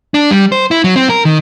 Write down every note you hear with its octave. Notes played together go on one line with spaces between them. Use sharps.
D4
G3
C5
E4
F#3
C4
A#4
D#3